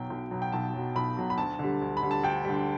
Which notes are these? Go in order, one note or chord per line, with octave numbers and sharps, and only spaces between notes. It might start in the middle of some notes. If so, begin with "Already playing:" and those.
Already playing: B1 B2 F#3 G5
B1
B2 F#3
G5
B1 A5
B2 F#3
B1 B5
B2 F#3
B5
D2 A5
D3 G3
D2
B5
D3 G3
A5
D2 G5
D3 G3